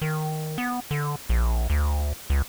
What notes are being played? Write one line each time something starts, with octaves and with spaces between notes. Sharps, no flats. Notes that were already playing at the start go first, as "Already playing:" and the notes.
D#3
B3
D3
A#1
D2
C#2